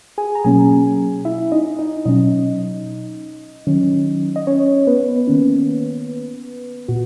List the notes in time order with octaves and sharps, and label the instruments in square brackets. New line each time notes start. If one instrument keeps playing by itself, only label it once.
[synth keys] G#4 G#5
A#5
B2 F#3 A#3 C#4 G#4 G#5
E4 E5
D#4 D#5
D#4 D#5
B2 F#3 C#4 D#4 D#5
D#3 F#3 C#4
D#5
C#4 C#5
B3 B4
D#3 A#3 C#4
A#2 F#4